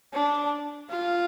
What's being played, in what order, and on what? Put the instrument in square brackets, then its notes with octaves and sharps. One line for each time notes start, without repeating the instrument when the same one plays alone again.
[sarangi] D4
F4